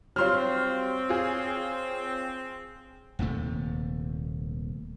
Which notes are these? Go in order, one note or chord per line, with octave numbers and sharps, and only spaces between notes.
F#3 G3 C4 F4 C#5 C6 F6
F4 G#4
D#1 D#2 C3 A3